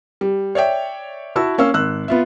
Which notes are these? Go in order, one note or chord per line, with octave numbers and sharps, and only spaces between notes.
G3
C#5 D5 E5 G5
E4 F#4 A5 E6
A#3 C#4 F5 E6
G#1 E6 F#6
B3 F4 E5